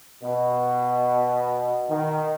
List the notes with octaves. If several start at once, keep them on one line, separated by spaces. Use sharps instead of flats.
B2
D#3